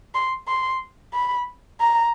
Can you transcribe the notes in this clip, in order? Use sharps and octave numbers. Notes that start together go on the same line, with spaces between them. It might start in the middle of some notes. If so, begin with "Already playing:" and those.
C6
C6
B5
A#5